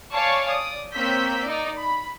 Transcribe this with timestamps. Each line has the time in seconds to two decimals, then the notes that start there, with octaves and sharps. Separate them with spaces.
0.13 C#5 D5 F5 G#5 A5 C#6
0.48 D5 D#6
0.94 A#3 C4 C#5 E6 G6 B6
1.44 D#4 D5
1.79 B5